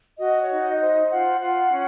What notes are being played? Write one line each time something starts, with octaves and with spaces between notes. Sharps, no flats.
F#4 D#5
C#5
D#4
D#5
C5 D#5
F4 F#5
F4 F#5
C#4